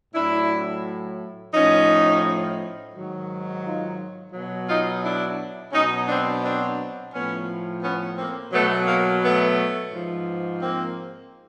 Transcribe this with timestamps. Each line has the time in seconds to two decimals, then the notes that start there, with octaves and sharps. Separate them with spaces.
0.14 A2 F#3 D4 E4
1.53 A2 F3 C#4 D#4
2.93 G#2 D#3 F#3
3.63 D#4 F4
4.33 B2 F#3
4.68 D#4 F4
5.02 D4 E4
5.72 B2 F#3 C#4 D#4
6.07 C4 D4
6.42 C4 D4
7.12 A2 F3 B3 C#4
7.82 B3 C#4
8.17 A#3 C4
8.51 B2 F#3 A3 B3
8.87 A#3
9.22 A3 B3
9.92 G#2 F3
10.62 A#3 C4